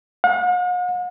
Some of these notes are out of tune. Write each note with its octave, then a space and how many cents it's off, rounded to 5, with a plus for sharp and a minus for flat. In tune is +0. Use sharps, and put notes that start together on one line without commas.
F#5 -45